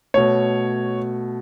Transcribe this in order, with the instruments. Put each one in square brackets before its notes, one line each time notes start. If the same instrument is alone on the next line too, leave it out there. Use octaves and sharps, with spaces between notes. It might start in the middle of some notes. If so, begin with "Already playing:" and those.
[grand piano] B2 A3 C#5